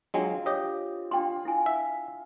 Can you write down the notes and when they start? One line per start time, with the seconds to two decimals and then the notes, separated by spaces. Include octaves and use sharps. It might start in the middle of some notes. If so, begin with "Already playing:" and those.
0.14 F#3 G#3 C4 D4 F4
0.46 G4 C#5 D#5
1.11 D4 F4 G5 C6
1.45 E4 G#5
1.66 E5